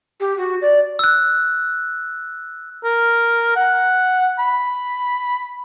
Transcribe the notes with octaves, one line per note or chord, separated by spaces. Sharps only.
G4
F#4
D5
E6 F#6
A#4
F#5
B5